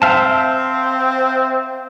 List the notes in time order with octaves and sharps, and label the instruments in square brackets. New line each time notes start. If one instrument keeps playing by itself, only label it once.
[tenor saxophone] C4 [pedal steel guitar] E5 F5 A5